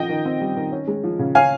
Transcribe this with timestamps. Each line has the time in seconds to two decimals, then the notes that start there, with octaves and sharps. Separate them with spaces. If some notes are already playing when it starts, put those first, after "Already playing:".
Already playing: F3 D#5 G5
0.09 D#3
0.25 C4
0.41 G3
0.57 D#3
0.72 C#4
0.87 G#3
1.04 F3
1.19 C#3
1.35 C#4 F5 G#5